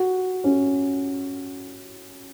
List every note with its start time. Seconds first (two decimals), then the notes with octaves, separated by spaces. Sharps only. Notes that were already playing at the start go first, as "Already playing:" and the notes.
Already playing: F#4
0.44 C#4